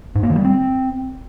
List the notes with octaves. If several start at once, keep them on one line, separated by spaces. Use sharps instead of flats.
G#2
A#3
D#3
G3
C4